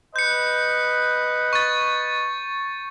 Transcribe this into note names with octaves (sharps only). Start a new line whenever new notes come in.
B4 D#5 G6 C#7
C#6 A6